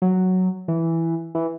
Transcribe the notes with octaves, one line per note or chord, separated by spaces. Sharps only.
F#3
E3
E3